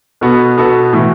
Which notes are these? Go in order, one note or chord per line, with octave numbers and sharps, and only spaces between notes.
B2 B3 F#4 A4
B2 B3 F#4 A4
A2 E3 A3 F#4